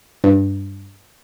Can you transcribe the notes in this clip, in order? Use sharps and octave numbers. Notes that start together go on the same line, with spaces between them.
G2